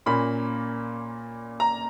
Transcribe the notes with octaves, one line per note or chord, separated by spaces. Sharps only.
A#2 A#3 C#4 B5
A#5